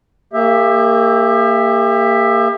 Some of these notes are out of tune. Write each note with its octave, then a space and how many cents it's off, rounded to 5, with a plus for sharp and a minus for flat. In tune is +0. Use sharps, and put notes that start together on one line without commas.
A#3 -20 G4 +35 E5 +0